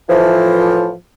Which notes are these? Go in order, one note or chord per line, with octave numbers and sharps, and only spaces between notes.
A2 E3 F3